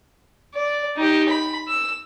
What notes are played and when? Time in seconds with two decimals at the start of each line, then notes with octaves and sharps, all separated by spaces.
0.54 D5
0.97 D#4 G4
1.29 B5
1.68 E6